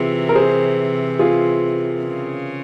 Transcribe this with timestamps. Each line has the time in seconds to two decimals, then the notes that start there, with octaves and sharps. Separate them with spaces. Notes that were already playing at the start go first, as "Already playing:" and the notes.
Already playing: C3 E3 F4 G#4
0.29 A#4
0.35 G#4 C5
1.19 F4 G#4
2.04 C#3